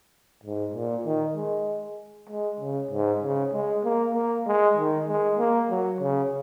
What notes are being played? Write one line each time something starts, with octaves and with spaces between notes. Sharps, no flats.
G#2
A#2
D#3
G#3
G#3
C#3
G#2
C#3
G#3
A#3
A#3
G#3
D#3
G#3
A#3
F#3
C#3